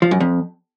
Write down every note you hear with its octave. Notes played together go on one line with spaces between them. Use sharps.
F3
F#2
F2